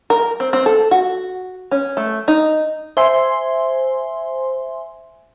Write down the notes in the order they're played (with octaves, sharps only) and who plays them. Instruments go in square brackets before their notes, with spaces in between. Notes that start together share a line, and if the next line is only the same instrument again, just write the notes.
[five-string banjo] A#4
C4
C4
A4
F#4
C#4
A3
D#4
[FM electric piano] C5 E5 G#5 C6